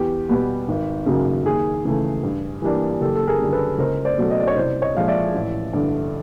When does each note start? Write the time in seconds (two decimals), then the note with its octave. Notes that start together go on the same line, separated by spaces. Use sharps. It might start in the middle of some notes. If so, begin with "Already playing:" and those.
Already playing: E2 G4
0.29 B2 G3 B3
0.68 G#1
1.06 F#2 C#3 F#3 A#3
1.45 D#2 G#4
1.85 C#3 E3 A3
2.23 G2
2.62 E3 G3 A#3 D4
3.01 F#1 G4 A4
3.15 A4
3.27 G#4 A#4
3.39 F#2 D3 G3
3.53 A4 B4
3.78 C#2 A#4 C5
4.05 C5 D5
4.18 B2 F#3 A3 C#4
4.30 D#5
4.40 D5
4.47 C#5 D#5
4.56 C2 C5 D5
4.82 C#5 D#5
4.95 A#2 F3 G#3 F5
5.08 D5 E5
5.33 A1
5.73 G2 D3